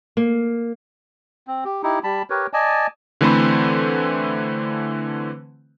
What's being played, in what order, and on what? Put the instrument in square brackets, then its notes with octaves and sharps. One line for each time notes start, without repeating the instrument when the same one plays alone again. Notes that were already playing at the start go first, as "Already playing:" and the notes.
[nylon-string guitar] A#3
[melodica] C4
G4
D#4 E4 G4
G3 A5 B5
G4 A#4 B4 C#5
D5 D#5 G#5 A5
[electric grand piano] D3 E3 A3 C4 B4 C5